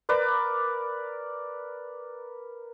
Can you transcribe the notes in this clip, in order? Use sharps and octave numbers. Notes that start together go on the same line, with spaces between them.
A#4 B4 D5 D6